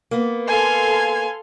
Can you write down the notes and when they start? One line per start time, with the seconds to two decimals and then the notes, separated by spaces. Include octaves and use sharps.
0.11 A#3 B3
0.48 A4 F5 G#5 C6